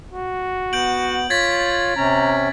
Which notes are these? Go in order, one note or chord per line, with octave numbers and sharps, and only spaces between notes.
F#4
B3 G6 D7 F#7
F4 C#5 G#6 A6 B6
C3 C#4 A#5